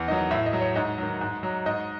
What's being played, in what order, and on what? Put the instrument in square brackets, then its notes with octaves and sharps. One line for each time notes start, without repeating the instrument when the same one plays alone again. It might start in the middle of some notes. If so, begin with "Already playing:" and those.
Already playing: [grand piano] E2
D#3 F#3 D#5
A2 E5
D#5
F#3
C#5
G#2 D#5
D#3 F#3
G#2
F#3
G#2 D#5